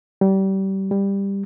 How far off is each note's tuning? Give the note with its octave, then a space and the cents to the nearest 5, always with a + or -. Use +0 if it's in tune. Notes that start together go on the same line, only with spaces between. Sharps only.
G3 -25
G3 +15